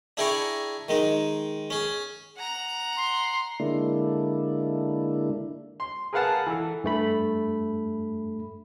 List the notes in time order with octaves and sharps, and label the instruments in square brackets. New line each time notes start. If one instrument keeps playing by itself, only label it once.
[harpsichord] D4 E4 G#4 G5 A#5 C#6
D#3 G#3 D#4
C#4 G#4
[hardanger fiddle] F#5 A#5
[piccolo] C6
[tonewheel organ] D3 G#3 A#3 D4 E4
[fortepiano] C6
G#4 A#4 B4 F5 F#5 A5
E3 A4
[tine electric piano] G2 A3 B5